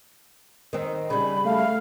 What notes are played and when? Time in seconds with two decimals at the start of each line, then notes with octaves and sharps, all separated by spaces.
0.73 D#3 C4
1.10 C#3 G3 B5
1.45 A3 F5